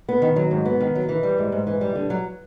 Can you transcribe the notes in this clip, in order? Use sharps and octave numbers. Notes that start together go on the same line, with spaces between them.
B3
D#3
F#3
G#2
B3
D#3
F#3
E3
G3
G#2
G#2
E3
G3
D3
F#3